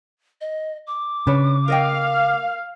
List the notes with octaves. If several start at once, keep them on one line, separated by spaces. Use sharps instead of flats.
D#5
D6
C#3 D4 B4 C#5
A#4 D#5 F5 G5